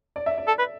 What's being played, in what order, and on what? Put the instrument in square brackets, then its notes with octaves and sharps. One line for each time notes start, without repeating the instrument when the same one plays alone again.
[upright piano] D5
E5
D5
[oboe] A4
B4